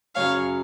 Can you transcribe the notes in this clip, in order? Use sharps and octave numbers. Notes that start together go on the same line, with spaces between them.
F#2 C#3 F#3 C#4 G#4 C#5 F5